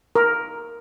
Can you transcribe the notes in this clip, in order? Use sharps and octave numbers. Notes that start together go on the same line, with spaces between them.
A#4